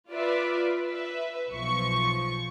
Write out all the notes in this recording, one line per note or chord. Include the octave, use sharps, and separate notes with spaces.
F4 B4 D5 E5
B4 E5
B1 F3 C#6